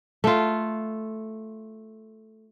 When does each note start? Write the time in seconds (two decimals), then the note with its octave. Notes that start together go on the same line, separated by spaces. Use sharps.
0.24 A3 F4